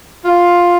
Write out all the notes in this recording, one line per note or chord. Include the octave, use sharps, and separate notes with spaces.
F4